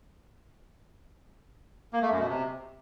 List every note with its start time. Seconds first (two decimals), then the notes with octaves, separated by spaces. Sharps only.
1.93 A#3
2.02 A3
2.11 F#2
2.19 B2
2.28 C3